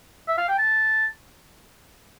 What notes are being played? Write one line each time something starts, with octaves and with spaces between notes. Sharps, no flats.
E5
F5
G5
A5